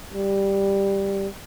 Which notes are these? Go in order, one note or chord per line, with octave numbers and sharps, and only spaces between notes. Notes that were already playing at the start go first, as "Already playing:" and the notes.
G3